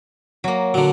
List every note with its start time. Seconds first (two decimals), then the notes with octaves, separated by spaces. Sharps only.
0.44 F#3 A#3
0.74 D3 F#3